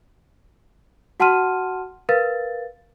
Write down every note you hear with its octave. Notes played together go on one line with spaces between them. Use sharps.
F#4 F#5 A5 C6 F6 D#7
A#4 B4 F5 A6